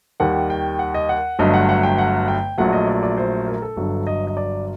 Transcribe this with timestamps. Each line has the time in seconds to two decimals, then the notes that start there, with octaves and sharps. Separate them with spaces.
0.20 D#2 D#3 G3 F#5
0.50 G5
0.79 F#5
0.94 D#5
1.09 F#5
1.39 G1 G2 F#3 A3 D#5
1.54 F#5
1.69 F#5
1.83 G5
1.98 F#5
2.28 G5
2.58 A#1 A#2 F#3 A3 F#5
2.73 D#5
2.88 D5
3.03 D5
3.17 C5
3.48 A#4
3.62 A4
3.76 G1 G2 F#3
4.07 D#5
4.27 D#5
4.37 D5